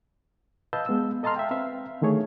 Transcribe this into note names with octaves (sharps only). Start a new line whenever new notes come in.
B4 D#5 F5 A5 E6 G6
G#3 B3 F5 E6
A4 D#5 A5 A#5 C6 F6
E5 F5 G5
C4 B4 E5 F5
D3 D#3 A3 G#4 C#5